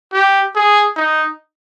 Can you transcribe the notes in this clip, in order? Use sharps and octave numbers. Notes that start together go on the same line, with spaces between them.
G4
G#4
D#4